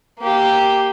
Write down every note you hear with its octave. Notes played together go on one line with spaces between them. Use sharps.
A#3 G4